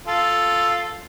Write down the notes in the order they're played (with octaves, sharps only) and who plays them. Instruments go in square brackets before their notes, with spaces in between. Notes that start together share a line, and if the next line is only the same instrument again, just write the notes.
[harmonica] F4 A4